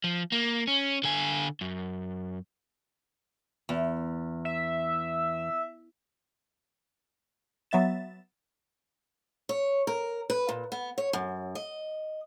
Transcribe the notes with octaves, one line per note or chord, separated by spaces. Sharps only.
F3
A#3
C#4
D3 G#5
F#2
E2
E5
F#3 B3 E5 A6 E7
C#5
A#4
B4
A#2
B3
C#5
F#2
D#5